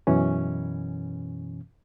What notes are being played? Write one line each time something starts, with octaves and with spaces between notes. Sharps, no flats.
F#2 B2 E3 C#4